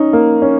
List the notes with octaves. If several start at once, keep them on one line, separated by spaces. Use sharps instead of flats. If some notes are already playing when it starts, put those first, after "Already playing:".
Already playing: C#4 D#4
A#3
C#4